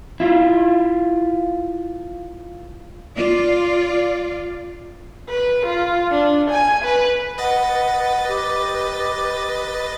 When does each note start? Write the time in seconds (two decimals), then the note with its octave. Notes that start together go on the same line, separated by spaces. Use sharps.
0.20 E4 F4
3.17 F4 D5
5.30 B4
5.66 F4
6.11 D4
6.50 G#5
6.85 B4
7.38 B4 D#5 F#5 A6
8.27 G4